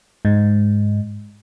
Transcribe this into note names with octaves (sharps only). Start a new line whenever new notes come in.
G#2